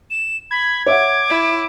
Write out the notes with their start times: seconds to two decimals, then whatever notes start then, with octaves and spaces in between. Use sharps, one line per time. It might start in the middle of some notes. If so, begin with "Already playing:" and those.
0.10 E7
0.51 B5 G#6
0.86 C#5 E5 F#5 D6
1.30 E4